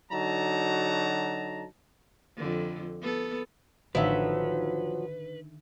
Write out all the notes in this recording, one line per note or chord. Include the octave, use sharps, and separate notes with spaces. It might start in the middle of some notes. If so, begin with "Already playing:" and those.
D3 F#3 D#4 F#4 A5 A#5
F2 D3
B3 A4
A1 D3 D#3 F3 F#3 B4 E5